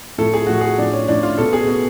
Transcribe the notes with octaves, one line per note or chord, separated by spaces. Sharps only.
A2 F3 A4
G#4
A2 F3 F#4
G#4
A2 F3 D4
C#4
A2 F3 D4
F4
B2 A4
G#4
B2